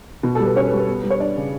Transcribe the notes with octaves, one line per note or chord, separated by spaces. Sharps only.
B2
G3 A4
B4
C#4 C#5
B4
G3
B4
B3
G3
C#5
D4 D5
C#3